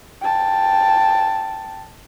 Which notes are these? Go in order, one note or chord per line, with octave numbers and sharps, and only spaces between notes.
G5 A5